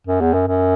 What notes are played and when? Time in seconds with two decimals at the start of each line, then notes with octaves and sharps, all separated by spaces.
0.07 F#2
0.21 E2
0.34 F#2
0.47 F#2